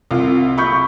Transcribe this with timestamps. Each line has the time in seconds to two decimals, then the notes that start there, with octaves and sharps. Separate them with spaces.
0.11 C2 F4
0.58 B5 C#6 G6